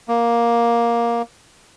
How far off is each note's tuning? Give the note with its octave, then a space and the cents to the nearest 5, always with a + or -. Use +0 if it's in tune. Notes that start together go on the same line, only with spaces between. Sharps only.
A#3 +10